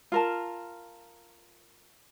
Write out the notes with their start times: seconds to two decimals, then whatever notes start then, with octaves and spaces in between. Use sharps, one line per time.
0.12 F4 A#4 A5